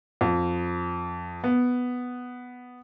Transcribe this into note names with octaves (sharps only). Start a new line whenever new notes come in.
F2
B3